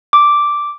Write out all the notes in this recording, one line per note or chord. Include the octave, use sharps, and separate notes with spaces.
D6